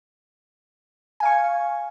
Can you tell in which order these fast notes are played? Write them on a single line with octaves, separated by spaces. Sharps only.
G#5 F5 C#6